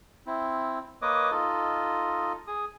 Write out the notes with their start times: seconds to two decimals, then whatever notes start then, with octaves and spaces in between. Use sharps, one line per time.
0.27 C4 E4
1.02 A#3 B4 C#5 D#5 D6 D#6
1.31 D#4 F4 A4 D#5
2.47 G#4 D#6